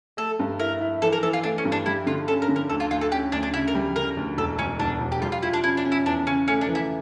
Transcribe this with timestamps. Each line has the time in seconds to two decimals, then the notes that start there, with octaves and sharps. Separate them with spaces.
0.17 A3 A4
0.39 G2
0.59 E4 A#4
0.81 E4
1.02 E3 A4
1.13 A#4
1.23 E3 A4
1.33 F4
1.44 A3 D4
1.58 C#4
1.65 G2
1.72 D4
1.86 G3 E4
2.06 D3 F4
2.27 C#4 A4
2.42 A#4
2.48 D3
2.56 A#4
2.69 D2 A4
2.80 F4
2.91 D2 F4
3.01 A4
3.12 C#4 G4
3.32 D2 D4
3.43 D4
3.54 C#3 E4
3.68 A#4
3.75 G3
3.96 C#3 A#4
4.17 D2
4.38 E1 A4
4.59 E1 C#4
4.79 E1 D4
5.01 E1
5.12 G4
5.22 G3 F4
5.32 F4
5.43 E4 F4
5.53 D4
5.64 C#4 E4
5.77 D4
5.85 C#4
5.92 E4
6.06 E2 D4
6.27 C#3 C#4
6.48 A3 C#4
6.61 D4
6.68 E3
6.75 E4